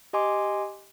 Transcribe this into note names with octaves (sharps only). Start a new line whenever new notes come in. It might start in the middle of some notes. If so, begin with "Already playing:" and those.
G4 D#5 G#5 C6 D6